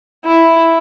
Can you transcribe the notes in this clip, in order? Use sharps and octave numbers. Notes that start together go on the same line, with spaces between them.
E4